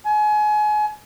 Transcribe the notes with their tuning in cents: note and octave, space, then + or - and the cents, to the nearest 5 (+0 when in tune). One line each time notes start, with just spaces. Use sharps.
G#5 +30